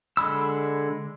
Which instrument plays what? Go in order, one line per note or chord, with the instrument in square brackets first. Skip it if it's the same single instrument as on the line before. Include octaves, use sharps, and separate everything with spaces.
[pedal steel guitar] D3 G#3 B5 E6